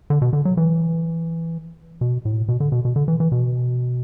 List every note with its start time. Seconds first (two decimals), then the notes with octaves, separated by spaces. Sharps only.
0.10 D3
0.22 B2
0.33 D3
0.45 F#3
0.57 E3
2.01 B2
2.25 A2
2.48 B2
2.60 D3
2.72 B2
2.85 B2
2.96 D3
3.08 E3
3.20 E3
3.32 B2